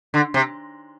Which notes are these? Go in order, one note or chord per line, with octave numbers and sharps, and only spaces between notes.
D3
C3